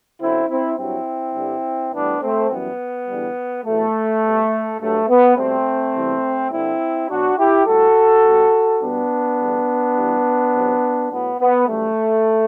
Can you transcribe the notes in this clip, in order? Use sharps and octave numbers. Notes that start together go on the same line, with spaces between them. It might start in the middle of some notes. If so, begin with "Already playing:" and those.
F#2 D3 F#3 C4 E4
C4 E4
G2 F#3 C4 E4
G2 D3 G3
A2 E3 G3 B3 D4
A3 C4
F#2 E3 G3 B3
E2 D3 G3
E2 B2 F#3 A3
B2 G3
G2 F#3 A3
B3
B2 G3 A3 C4
E2 C3 E3 G3
G2 D3 G3 C4 E4
B2 F#3 D4 F#4
E4 G4
A2 G3 F#4 A4
B2 G3
B2 G3 B3 D4
E2 D3 G3
G2 E3 G3
E2 C3 F#3
A2 F#3 B3
B3
F#2 E3 G3 A3